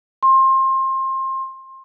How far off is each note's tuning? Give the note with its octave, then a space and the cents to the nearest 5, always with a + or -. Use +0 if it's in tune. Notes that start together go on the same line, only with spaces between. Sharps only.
C6 +25